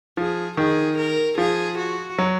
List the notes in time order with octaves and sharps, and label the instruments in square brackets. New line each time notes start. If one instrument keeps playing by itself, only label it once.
[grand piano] F3 [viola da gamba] G#4
[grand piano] D#3 [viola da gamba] G#4
[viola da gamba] A#4
[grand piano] F3 [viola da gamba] G#4
[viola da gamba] F#4
[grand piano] F#3